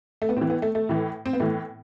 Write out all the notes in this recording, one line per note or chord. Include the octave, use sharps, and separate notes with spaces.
A3
B3
A2 E3 C4
B3
A3
A3
A2 E3
C4
B3
A2 E3 A3